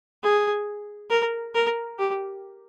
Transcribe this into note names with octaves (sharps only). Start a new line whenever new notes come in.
G#4
A#4
A#4
G4